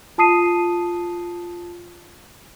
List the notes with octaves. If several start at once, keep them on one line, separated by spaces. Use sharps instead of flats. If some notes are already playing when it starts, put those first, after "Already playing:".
F4 A5 D#6 C7 D#7